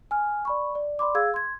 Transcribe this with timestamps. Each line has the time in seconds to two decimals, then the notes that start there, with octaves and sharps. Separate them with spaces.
0.11 G#5 F6
0.45 D5 B5 C#6
0.75 D5
0.99 D5 B5 C6 D6
1.15 G#4 F5 E6 G#6
1.34 C6 G#6